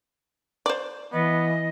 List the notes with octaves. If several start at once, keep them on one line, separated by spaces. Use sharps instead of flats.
C5 D5
E3 B3 D#5